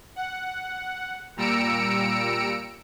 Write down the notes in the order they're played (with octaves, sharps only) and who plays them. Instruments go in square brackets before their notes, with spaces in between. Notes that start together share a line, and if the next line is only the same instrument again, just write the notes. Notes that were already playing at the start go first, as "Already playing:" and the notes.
[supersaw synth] F#5
A#2 G3 A#5 E6 C#7 D7